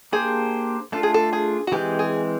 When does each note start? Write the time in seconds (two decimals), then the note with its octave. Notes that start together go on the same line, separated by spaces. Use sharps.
0.12 A#3 D4 G4 G#4 C5
0.92 A3 D4 F4 A4
1.03 G#4
1.14 A4
1.33 G#4
1.67 F#4
1.72 E3 G#3 C4 G4
1.99 G#4